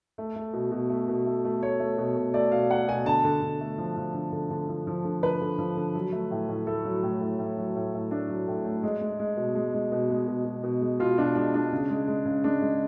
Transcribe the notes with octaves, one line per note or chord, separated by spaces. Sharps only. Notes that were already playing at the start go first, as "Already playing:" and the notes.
A3
A3
B2
B2
A3
B2
A3
A3
A3 C#5
A3
B2
B2
A3 D5
B2 F5
A3 F#5
B2 G#5
D3 A5
D3
D3
A3
F3
F3
D3
D3
D3
F3
F3
D3
D3 B4
D3
F3
D3
F#3
A3
A2
A2
A3 A4
F#3
A2
A2
A2
F#3
A2
A2
A3 D4
F#3
A2
A3
G#3
G#3
G#3
B2
G#3
G#3
B2
G#3
B2
B2
B2
G#3
B2 F4
B2 D4
G#3 D4
G#3 D4
C#3
G#3
G#3
C#3
G#3 D4
G#3